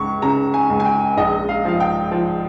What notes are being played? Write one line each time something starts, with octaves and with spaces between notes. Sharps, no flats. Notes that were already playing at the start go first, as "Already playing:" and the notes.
Already playing: C#2 C#6
C#3 A#5
G#5
C#2
G#5
G5
A#1 D#5
F5
F3 F5
G5
F3